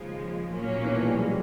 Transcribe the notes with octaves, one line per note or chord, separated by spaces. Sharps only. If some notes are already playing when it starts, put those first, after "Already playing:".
Already playing: D#2 C#3 F3 G#3
B1 A#2 F#3 A#3 C#4
E3
F3
G3
G#3
G3